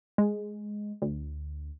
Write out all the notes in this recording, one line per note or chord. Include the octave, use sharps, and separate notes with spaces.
G#3
D2